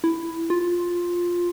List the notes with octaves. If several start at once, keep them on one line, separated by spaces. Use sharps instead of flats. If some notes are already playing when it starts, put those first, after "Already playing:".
E4
F4